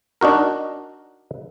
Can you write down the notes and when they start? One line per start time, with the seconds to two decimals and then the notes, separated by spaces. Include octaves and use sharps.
0.21 D4 D#4 F#4 A#4